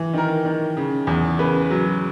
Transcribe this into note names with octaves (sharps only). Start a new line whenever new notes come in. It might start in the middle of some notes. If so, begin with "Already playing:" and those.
Already playing: E3
D#3 A#4
D#3
C#3
E2
C#3 B4
F#3